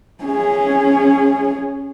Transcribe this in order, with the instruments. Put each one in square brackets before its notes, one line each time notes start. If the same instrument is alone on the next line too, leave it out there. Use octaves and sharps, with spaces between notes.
[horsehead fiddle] C#4 G#4